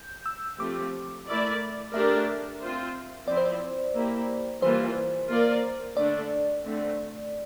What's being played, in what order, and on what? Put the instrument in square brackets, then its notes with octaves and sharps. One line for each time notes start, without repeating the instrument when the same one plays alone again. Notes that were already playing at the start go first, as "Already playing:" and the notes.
Already playing: [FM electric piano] G6
E6
[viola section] F3 A3 C4 G4 [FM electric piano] D6
[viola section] A3 E4 A#4 D5
[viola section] A3 D4 G4 A#4 D5 [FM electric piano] E5
[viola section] C4 F4 C5
[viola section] F3 C4 E4 [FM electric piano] D5
[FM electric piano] C5
D5
[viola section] A#3 E4 G4
[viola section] E3 G3 A#3 F4 [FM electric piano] C5
[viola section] A#3 F4 A#4 D5
[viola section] D3 A3 D4 A4 [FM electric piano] D5
[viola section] D3 A3 C4